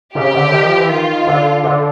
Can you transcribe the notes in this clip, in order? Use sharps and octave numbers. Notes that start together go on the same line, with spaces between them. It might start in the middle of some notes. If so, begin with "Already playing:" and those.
C#3 G4
D3
D#3
F3
E3
D#3 F4
D3
D3